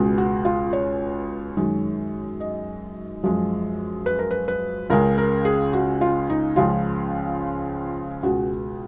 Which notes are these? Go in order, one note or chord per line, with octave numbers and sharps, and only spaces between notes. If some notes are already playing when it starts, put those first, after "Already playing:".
Already playing: C#2 B2 G#3
F#4
F4
C#5
F#2 D#3 G#3
D#5
F#2 F3 G#3
B4
A#4
B4
B4
C#2 C#3 G#3 A#4
A#4
G#4
F#4
F4
D#4
C#2 C#3 F3 G#3 F4
C#2 B2 G#3 F#4